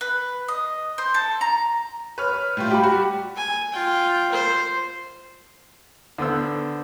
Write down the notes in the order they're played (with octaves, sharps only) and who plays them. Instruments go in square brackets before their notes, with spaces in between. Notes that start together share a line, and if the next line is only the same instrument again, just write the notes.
[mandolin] B4
D#5
C5
A4
A#5
[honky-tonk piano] B4 C#5 F6
A2 G3 F4
[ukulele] G4 B5
[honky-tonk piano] G3 F#4
[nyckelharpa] G#5
F4 G5
C5
[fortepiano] D3 B3 C5 E6